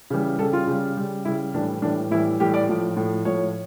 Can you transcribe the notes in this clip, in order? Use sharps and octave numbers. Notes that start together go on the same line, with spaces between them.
C#3 E3 G3
C#3 G3 A4
F4
C#3 G3
C#3 G3
C#3 G3 E4
A2 E3 G3 D4
A2 E3 G3 D4
A2 E3 G3 E4
A2 E3 G3 G4
D5
A2 F3
A2 F3
A2 F3 C#5